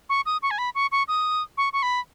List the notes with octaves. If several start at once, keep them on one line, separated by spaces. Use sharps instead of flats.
C#6
D#6
C#6
G#5
B5
C#6
C#6
D#6
C#6
C#6
B5